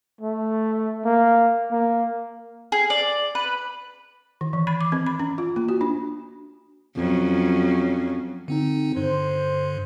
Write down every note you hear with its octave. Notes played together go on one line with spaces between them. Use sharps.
A3
A#3
A#3
G#4
D5
B4
D#3
E3
B5
D6
C4
B5
C#4
F4
A#3
F#4
D4
F2 F#3 C#4
D3 C4 D#4
G2 D3 C5